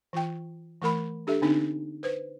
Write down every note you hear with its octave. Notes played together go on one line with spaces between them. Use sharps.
E3 F4 G5
E3 A3 A#4 B5
D4 G4 A4 E5
D3 B3 C4 D4 D#4
B4 C5